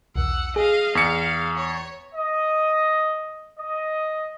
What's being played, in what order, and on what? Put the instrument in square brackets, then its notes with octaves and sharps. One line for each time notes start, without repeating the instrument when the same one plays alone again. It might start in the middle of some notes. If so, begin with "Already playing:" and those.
[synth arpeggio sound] B1 E2 [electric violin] F#5 E6
[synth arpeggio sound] G#4 [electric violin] D#5 F5
[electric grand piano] E2 C#7 [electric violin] F5
[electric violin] C#5
[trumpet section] D#5
D#5